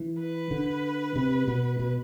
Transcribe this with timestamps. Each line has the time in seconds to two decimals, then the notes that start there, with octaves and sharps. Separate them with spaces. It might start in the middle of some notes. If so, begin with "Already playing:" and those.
Already playing: E3
0.19 B4
0.51 D3
1.16 C3
1.48 B2
1.80 B2